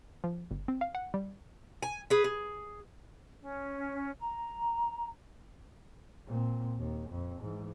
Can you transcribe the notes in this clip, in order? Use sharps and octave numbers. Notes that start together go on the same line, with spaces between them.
F3
G1
C4
F5
F#5
G3
G#5
G#4 B4
G#4
C#4
A#5
A#2 C4
D#2
F2
G#2 E3